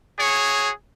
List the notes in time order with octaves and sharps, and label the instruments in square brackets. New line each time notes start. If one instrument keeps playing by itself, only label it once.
[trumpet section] F#4 G#4 C#5